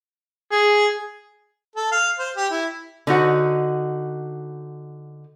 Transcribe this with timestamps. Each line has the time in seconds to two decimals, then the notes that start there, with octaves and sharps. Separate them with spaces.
0.52 G#4
1.76 A4
1.92 F5
2.19 C5
2.36 G4
2.51 E4
3.07 D3 D#4 F#4 C5